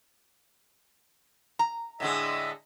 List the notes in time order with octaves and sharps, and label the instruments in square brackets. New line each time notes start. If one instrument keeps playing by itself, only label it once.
[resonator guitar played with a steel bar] A#5
[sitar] A2 D3 G#3 [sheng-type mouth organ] D#5 E5